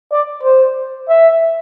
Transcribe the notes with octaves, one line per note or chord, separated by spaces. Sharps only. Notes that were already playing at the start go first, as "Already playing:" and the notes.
D5
C5
E5